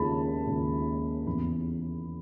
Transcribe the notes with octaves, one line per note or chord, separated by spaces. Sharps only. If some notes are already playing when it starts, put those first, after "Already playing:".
Already playing: D#2 C#3 G#3 A5 B5
D#2 C#3 G#3
E2 C#3 E3 B5